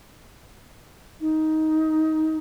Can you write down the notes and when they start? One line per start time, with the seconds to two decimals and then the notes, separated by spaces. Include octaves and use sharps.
1.21 D#4